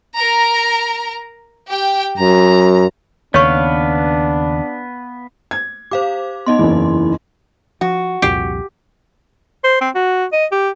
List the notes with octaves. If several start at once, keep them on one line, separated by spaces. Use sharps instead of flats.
A#4 A#5
G4 G5
F#2 A#5
D#2 C#3 B3 D4 B4 C#5 F5 C#6
G#6
G4 C5 F5 D6
B3 D#4 D#5 C6
F#1 E2 E4
F3 F#4
C2 F2 A#2 G4
C5
C4
F#4
D#5
G4